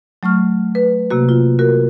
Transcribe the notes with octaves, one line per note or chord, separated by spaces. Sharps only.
F#3 A3 C#6 F6
B4
C3 A#3 F#4
F4
F#4 A#4